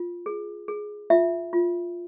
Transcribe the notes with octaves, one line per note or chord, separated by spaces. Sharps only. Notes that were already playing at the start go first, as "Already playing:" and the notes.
Already playing: F4
G#4
G#4
F4 E5
F4